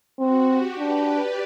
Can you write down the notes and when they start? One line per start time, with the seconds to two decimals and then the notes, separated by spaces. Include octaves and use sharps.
0.19 C4 F#4
0.48 G4
0.78 D4 G4 B4
1.08 B4 D5